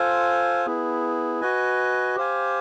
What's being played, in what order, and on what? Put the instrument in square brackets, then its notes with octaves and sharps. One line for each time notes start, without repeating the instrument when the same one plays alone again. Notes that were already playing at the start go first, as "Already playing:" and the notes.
Already playing: [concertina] F4 A4 C5 F5 G#5
B3 E4 G#4
F#4 B4 D#5 G#5
G4 C5 F5 G#5